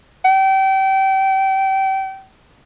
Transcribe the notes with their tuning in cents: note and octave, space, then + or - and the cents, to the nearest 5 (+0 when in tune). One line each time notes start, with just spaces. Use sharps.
G5 -30